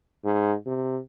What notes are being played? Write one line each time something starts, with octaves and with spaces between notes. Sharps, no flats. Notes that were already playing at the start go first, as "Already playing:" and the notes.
G#2
C3